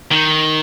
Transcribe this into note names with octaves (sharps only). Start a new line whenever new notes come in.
D#3